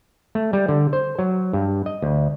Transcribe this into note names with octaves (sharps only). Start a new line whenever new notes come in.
A3
G3
D3
C5
F#3
G2
D#5
D2